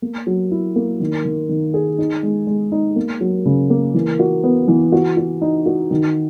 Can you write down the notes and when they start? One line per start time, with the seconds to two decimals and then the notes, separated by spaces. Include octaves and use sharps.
0.02 A#3
0.27 F#3
0.51 E4
0.76 A#3
1.00 D#3
1.25 D#3
1.49 D#3
1.74 G#4
1.98 D#4
2.23 G#3
2.47 G#3
2.72 D#4
2.96 A#3
3.21 F#3
3.46 C#3
3.70 A#3
3.94 E3
4.19 F#4
4.44 B3
4.68 E3
4.92 F#4
5.17 F#4
5.41 D#4
5.66 F#4
5.91 D#3